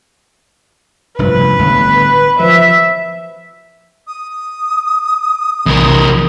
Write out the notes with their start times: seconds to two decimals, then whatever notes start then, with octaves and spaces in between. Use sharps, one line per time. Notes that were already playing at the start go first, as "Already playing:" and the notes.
1.19 F1 G2 F3 B4
1.59 G1 D2 A2
2.40 F3 E5
4.07 D#6
5.66 B1 E2 C3 E3 A#4